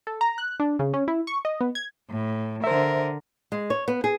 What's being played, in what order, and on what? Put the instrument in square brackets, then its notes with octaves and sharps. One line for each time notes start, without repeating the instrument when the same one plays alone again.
[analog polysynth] A4
A#5
F#6
D4
C#3
C#4
E4
C#6
D#5
B3
G#6
[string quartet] A2
[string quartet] D3 A#4 [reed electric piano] C5 E5
[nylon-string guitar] G#3
C#5
B3
G#4